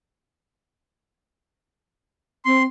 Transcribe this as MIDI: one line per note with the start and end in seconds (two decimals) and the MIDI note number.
2.45 2.64 60
2.45 2.63 84